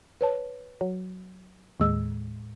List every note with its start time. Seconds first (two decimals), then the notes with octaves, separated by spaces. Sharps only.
0.21 B4 C#5 A5
0.81 F#3
1.80 D#2 A2 G#3 E6